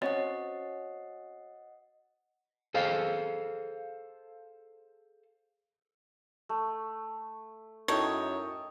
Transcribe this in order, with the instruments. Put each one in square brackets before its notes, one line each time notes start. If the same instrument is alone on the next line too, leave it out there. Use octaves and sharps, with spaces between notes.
[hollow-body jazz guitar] C4 C#4 F#4 [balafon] C#5 [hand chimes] D#5 F#5
[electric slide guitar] G#4 A4 C5 F5
[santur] A3
[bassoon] F#2 [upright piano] D#4 E4 A4 [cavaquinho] C#5 [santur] D#5 G5 A5